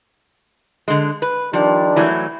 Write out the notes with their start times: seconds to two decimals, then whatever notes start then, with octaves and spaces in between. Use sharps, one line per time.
0.88 D3 G#3
1.22 B4
1.53 D#3 F3 G3 D4
1.96 E3 F#3 A3